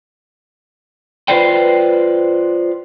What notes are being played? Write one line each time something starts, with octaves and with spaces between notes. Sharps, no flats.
F4 B4 C5 D5 G5